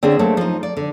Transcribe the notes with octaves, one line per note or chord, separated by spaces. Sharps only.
D3 C4 C#4 G#4 A4
F#3 A3 A#3 C4
F3 D#4
D5
D3